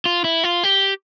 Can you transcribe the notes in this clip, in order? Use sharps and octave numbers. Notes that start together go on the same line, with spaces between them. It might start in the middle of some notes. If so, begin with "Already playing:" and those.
F4
E4
F4
G4